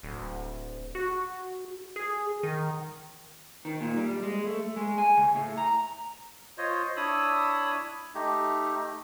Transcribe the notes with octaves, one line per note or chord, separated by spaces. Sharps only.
D1
F#4
G#4
D#3
D#3
A#2
G3
G#3
A3
G#3
G#5
C#3
A2
A#5
F4 C5 C#5 D#5
D4 E4 C#5 B5 D#6 E6
A3 D#4 G4